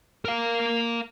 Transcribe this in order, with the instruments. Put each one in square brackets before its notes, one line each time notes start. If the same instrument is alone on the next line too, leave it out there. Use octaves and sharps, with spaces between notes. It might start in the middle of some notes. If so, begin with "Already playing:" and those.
[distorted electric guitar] A#4 F5